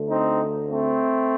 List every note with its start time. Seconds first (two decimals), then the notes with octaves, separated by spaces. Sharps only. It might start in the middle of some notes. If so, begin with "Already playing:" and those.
Already playing: D2 D3 A3
0.09 C4 D#4
0.69 A3 C4